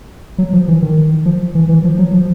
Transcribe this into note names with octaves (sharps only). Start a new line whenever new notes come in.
F#3
F3
E3
D#3
F3
E3
E3
F3
F#3
F3